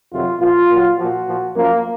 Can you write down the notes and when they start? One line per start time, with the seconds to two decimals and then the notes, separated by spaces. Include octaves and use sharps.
0.12 F2 C3 D#3 F#3 F4
0.40 A#2 F3 F4
0.70 A#2 F#3
0.98 A#2 F3 F#4
1.28 A#2 F3
1.56 F#2 F3 A#3